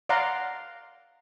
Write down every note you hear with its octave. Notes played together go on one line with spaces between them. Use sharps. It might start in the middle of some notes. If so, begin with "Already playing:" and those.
D5 F5 F#5 A#5 C6